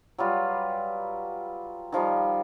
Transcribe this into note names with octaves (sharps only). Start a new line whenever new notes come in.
F#3 G3 F4 B4
D#3 F3 G3 D#4